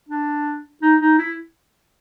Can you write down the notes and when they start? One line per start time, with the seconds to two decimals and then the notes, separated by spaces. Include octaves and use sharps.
0.09 D4
0.82 D#4
1.01 D#4
1.19 E4